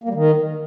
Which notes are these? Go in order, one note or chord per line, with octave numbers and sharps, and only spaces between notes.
A#3
G3
D#3